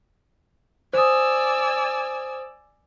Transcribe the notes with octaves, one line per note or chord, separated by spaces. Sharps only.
C5 D5 G#5 D#6 E6